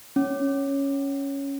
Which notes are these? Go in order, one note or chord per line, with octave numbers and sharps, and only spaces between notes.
C#4